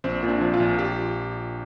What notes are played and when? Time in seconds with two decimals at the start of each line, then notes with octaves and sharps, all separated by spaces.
0.04 A#1 C4
0.23 A#2
0.28 D4
0.41 F3
0.54 F4
0.60 A#1
0.79 G4